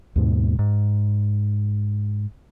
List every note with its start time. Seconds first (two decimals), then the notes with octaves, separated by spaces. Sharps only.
0.16 D#2 G#2 B2
0.59 G#2